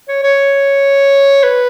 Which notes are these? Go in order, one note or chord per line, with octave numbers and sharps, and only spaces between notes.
C#5
C#5
B4